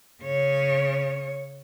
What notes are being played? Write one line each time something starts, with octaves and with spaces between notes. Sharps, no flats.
C#3 C#5